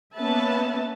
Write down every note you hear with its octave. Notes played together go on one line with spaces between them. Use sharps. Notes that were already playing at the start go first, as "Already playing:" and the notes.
A#3 B3 C#4 B4 E5 A5